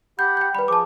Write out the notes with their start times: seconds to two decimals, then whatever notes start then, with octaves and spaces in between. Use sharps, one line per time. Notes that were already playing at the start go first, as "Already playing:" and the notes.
0.19 G4 F#5 B5 G6
0.37 G5 G6
0.55 G3 B4 B5
0.68 F3 G#4 A5 D6